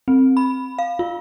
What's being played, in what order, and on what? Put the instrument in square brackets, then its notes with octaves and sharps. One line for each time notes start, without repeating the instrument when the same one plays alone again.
[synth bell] C4
B5
F5
F4